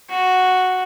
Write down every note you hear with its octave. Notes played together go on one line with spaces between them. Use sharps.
F#4